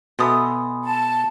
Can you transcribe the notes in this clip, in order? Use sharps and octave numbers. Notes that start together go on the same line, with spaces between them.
B2 A4 D#5 E5 G#5 B5 C6 D#6
A5